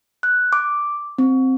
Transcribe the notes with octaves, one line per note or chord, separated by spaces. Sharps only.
F#6
D6
C4